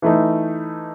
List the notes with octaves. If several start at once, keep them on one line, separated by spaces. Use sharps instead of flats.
E3 A3 D#4